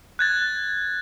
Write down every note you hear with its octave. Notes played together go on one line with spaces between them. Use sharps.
F#6 G#6 A6